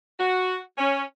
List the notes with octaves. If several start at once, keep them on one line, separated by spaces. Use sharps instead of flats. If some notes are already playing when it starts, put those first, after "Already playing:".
F#4
C#4